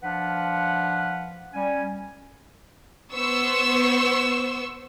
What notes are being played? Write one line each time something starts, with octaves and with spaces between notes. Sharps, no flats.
F3 D4 B4 F5 F#5
G3 C#4 G#5
B3 C5 C#6 E6